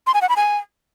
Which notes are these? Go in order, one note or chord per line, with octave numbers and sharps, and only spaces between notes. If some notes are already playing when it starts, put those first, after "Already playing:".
C6
G#5
F#5
B5
G#5